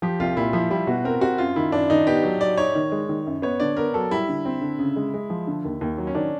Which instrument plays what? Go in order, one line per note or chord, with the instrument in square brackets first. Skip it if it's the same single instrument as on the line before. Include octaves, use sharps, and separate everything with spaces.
[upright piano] F3 [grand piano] G4
[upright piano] C2 [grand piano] F4
[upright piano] A#2 [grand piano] E4
[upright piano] F3 [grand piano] E4
[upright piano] G3 [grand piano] E4
[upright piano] B2 [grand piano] F#4
[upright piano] C4 [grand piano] A#4
[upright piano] C4 [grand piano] F#4
[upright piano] F#2 [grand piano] F4
[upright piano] D#3 [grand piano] E4
[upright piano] F#2 [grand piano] D4
[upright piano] D#3 [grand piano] D#4
[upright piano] B3 [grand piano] G4
[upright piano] F#3
[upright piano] F#3 [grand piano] D5
[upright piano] D#4 [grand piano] C#5
[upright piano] D#3
G#3
D#3
F#2
[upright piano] B3 [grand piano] C#5
[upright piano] D3 [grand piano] D5
[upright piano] B3 [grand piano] A#4
[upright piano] F#3 [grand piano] A4
[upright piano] G3 [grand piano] E4
[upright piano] D3
C4
D3
C#3
G#3
G#3
F3
D3
D#2
D#2
F#3
[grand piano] C#4
[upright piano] D#3 [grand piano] D4